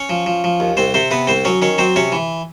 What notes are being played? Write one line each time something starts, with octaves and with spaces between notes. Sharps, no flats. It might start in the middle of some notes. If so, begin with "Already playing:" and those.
Already playing: C#4 C#5
F3
F3
F3
D#2
C2 C4 C5
C3 C4 C5
C3 B3 B4
C2 C4 C5
F#3 C#4 C#5
D#3 C#4 C#5
F#3 C4 C5
C3 C#4 C#5
E3